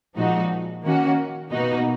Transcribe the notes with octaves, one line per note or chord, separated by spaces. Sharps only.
A#2 F3 G#3 D#4 F#4
D#3 A#3 C#4 F#4
B2 A#3 D#4 F#4